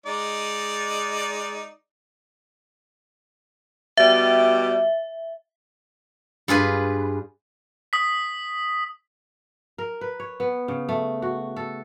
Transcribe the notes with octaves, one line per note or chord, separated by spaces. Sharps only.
G#3 D#4 D5
B2 G3 G4 E5
G2 F4 G#4 B4
D#6 B6
A#4
B4
C#5
B3
C#3
A3
F#4
A4